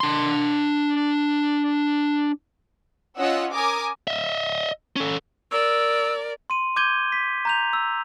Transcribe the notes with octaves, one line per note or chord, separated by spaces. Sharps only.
D4 C6
C#4 F4 D#5 F#5 E6
A#4 G#5 D6 D#6
D#5 E5
C#4 A4
A#4 D5 E6
C6 D#7
D6 G6 G#6 D#7 G7
B6
A#5 G6 F7
E6